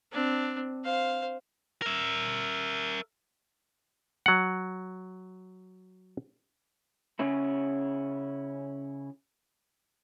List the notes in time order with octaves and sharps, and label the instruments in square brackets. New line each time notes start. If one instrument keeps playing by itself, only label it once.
[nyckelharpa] C4 D4
C5 F5
[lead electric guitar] A#4 E5
[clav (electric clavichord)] F#3 F#5
[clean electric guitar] C#3 C#4 E4